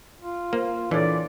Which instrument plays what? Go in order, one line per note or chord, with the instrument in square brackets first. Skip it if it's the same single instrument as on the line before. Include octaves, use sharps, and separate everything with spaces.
[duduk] F4
[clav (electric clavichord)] A#3 [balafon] C5
[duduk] A#2 [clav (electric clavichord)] E3 [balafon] D4 A4 C#5 [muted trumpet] D5